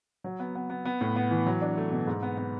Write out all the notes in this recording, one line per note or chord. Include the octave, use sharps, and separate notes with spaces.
F#3
B3
B3
B3
B3
A2
B3
E3
F#3
D4
A3
B2
G#2
B3
B3